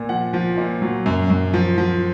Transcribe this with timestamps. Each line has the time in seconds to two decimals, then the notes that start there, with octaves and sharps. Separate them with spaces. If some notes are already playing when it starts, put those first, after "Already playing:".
Already playing: A#2
0.09 F3 F#5
0.33 F3
0.57 A#2
0.82 F#3
1.06 F#2
1.30 F#2
1.54 F3
1.78 F3